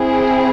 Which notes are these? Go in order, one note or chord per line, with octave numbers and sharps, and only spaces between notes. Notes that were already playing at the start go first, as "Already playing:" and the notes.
Already playing: C4 E4 G#4